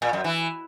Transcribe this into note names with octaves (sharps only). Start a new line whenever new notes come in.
A#2
F#2
E3